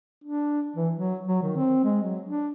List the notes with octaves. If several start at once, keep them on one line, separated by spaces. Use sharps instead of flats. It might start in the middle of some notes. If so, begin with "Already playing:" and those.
D4
E3
F#3
F#3
D#3
C4
G#3
F#3
D4